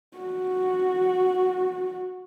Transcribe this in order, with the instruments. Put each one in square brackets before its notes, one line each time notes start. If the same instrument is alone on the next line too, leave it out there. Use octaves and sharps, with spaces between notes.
[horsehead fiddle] F#4